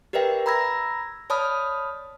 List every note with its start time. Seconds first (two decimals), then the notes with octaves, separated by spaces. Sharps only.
0.13 G4 A#4 B4 D5 E5 G5
0.46 A#5 B5 E6 G#6 A#6
1.30 C#5 D5 A5 B5 D#6 F6